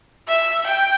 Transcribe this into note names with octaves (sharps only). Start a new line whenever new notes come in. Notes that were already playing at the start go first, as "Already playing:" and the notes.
E5
G5